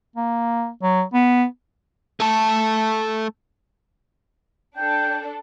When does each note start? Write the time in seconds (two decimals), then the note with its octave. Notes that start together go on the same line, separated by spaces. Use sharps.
0.16 A#3
0.82 F#3
1.14 B3
2.20 A3 A4
4.77 D4 A4 G5